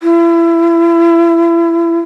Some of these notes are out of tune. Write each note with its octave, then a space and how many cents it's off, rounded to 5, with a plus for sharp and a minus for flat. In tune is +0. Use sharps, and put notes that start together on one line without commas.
E4 +30